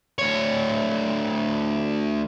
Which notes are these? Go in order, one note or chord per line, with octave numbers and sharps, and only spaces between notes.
D2 C#5